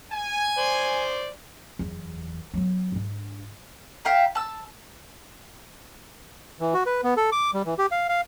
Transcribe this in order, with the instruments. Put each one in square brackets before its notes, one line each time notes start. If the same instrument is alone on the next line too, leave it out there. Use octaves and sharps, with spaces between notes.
[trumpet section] G#5
[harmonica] C5 D5
[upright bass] F#1 E2
F#3 B3
G#2 D4
[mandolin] E5 F5 G5 A#5
A5 E6
[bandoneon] E3
F#4
B4
B3
A4
D6
G3
E3
G4
F5
F5